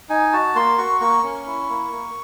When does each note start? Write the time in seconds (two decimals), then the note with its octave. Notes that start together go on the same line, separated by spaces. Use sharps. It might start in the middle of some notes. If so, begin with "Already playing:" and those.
0.10 D#4 G#5
0.33 F#4 A5
0.55 A#3 C6
0.78 F#4 C#6
1.01 A#3 C#6
1.23 C#4
1.46 E4
1.70 A#3
1.92 A#3